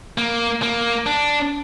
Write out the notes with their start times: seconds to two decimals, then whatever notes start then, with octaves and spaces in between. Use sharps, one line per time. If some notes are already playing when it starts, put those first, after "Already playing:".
0.18 A#3
0.63 A#3
1.06 D4